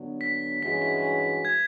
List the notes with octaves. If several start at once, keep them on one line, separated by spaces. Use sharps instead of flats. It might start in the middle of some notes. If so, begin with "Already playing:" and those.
Already playing: D3 F#3 B3
B6
G2 E3 G#3 C#4 F#4 B6
B6
G#6